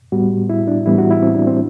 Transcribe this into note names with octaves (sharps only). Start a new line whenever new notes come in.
A2 G3 B3 F#4
E4
D4
A2 E3 G3 B3 E4
F#4
E4
C4
D4
C4